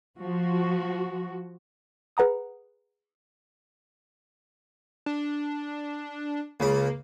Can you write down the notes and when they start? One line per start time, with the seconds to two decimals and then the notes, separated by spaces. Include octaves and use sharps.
0.20 F3 F#4
2.17 G#4 B4 F#5 A#5 D#6
5.06 D4
6.60 C#2 C#3 A#3 B5